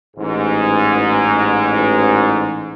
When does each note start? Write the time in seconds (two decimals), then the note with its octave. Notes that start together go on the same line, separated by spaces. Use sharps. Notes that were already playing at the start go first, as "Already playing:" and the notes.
0.17 A1 G#2